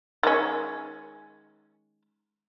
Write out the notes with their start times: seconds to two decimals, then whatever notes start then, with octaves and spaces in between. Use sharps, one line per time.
0.23 D#3 G#3 C#4